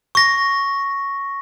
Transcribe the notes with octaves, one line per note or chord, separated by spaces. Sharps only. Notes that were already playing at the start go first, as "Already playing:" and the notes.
C#6 A#6